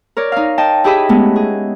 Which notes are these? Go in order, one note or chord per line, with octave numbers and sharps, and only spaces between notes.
A#4 C#5 D5
D#4 F5
D#5 G5 A5
E4 G4 G#4 D#5 E5 B5
G#3 A3 B3 C#4
G#4